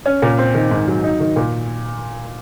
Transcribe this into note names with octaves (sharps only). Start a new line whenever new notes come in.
C#4
A#2
C4
D#3
G#2
F#3
D#4
D#3
A#2